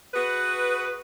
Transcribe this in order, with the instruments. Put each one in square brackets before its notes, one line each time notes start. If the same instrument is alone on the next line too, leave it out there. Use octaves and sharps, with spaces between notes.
[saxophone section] F#4 G#4 B4